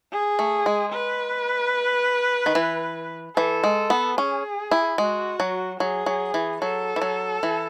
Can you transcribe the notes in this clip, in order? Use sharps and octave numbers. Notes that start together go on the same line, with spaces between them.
G#4
A3
G#3
B4
D#3
E3
E3 A4
G#3
B3
C#4 G#4
E4
G#3 F#4
F#3
F#3 G#4
F#3
E3
F#3 A4
E3
F#3
E3